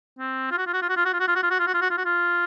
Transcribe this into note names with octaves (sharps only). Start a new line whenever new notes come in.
C4
F4
F#4
F4
F#4
F4
F#4
F4
F#4
F4
F#4
F4
F#4
F4
F#4
F4
F#4
F4
F#4
F4
F#4
F4